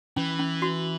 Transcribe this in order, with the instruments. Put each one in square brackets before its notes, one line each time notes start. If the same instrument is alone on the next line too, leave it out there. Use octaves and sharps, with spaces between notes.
[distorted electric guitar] E3 [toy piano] C#4
[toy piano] C#4
F#4